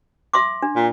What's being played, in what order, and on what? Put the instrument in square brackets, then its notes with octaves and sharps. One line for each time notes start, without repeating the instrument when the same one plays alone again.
[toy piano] E5 C6 D6
D4
[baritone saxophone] A#2